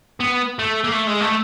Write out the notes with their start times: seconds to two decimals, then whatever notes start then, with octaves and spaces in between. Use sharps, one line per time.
0.20 B3
0.59 A3
0.84 A#3
0.92 A3
1.07 G#3
1.21 A3